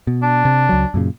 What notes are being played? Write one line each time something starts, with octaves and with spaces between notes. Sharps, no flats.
B2
D4
C3
C#2 F#3
F#2 A#2 C#3